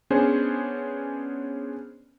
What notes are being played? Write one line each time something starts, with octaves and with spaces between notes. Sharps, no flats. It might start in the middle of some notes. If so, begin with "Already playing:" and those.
B3 C#4 D4 G#4 C5